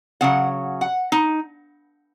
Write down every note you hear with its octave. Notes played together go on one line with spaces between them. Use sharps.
C#3 F#3 F#5
F#5
D#4